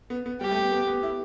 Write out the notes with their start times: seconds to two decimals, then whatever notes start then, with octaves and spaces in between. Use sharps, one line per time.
0.10 B3
0.26 B3
0.41 G3 G4
0.51 A3
0.61 B3
0.72 B3
0.87 B3
1.03 E4